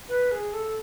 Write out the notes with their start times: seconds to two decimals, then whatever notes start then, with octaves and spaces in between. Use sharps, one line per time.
0.09 B4
0.31 G#4
0.53 A4